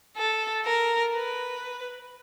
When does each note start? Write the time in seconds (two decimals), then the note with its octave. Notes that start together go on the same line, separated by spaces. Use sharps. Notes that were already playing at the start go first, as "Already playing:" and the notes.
0.17 A4
0.65 A#4
1.14 B4